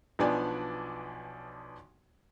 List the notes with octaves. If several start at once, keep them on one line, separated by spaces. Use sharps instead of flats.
B1 F3 B3 D4 D5 G#5